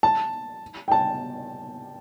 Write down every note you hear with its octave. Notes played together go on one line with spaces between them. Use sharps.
A5
G5
A5